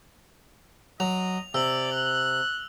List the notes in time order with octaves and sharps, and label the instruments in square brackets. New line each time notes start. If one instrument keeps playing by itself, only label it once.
[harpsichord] F#3 [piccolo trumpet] D#5 [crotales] F7
[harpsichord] C3 [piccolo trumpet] D5 [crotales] E6 F#7
[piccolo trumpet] F#6